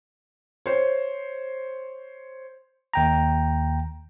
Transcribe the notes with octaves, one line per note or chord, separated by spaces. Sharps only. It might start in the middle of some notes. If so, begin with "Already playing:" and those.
C5 C#5
D#2 G5 A#5